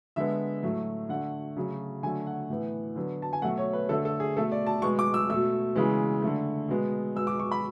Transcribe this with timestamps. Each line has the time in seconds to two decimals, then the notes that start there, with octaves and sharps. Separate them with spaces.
0.16 D3 G#3 B3 E5
0.63 A2 F#3 A3
1.09 D3 A3 F#5
1.57 C#3 F#3 A3
2.03 D3 F#3 A3 G#5
2.27 F#5
2.50 A2 E3 B3
2.96 D3 F#3 B3
3.22 A5
3.33 G#5
3.42 B2 F#3 A3 F#5
3.58 C#5
3.73 B4
3.89 D3 A3 A4
4.05 A4
4.20 G#4
4.36 B2 A3 A4
4.52 D5
4.67 A5
4.82 B2 G#3 B3 C#6
4.99 D6
5.14 E6
5.30 B2 A3 E6
5.75 C#3 E3 G#3 B3
6.22 D3 A3
6.69 B2 G#3 B3
7.15 B2 G#3 B3 E6
7.27 D6
7.39 C#6
7.52 B5